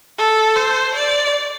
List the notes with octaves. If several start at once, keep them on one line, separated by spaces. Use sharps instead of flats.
A4
C5
D5